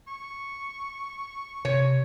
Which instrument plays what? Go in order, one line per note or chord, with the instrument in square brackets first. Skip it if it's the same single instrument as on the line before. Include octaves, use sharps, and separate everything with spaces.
[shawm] C#6
[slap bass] C3 [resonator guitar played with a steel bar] C#5